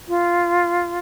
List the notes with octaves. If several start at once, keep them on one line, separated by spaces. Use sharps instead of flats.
F4